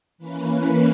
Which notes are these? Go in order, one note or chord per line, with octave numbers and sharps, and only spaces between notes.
E3 A#3 C#4 B4